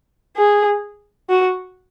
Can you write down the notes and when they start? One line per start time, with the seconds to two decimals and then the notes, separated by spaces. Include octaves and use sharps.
0.36 G#4
1.30 F#4